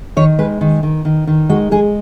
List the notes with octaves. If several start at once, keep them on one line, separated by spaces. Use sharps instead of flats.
D#3 C#5
G#3 B4
D#3
D#3
D#3
D#3
G#3 F#4
G#3 G#4